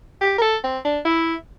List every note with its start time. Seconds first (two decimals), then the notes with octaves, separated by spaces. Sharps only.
0.21 G4
0.38 A#4
0.42 A4
0.64 C4
0.85 D4
1.05 E4